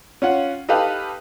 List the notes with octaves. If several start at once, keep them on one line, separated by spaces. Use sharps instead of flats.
C#4 F4 F#5
D#4 G4 A4 B4 F5